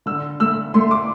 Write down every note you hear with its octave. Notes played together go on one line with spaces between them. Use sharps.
D3 E6
A3 E6
A3 C6
D6